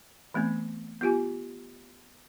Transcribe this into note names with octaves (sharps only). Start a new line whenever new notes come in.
E3 A3 B3 C4
B3 F4 G4 G#5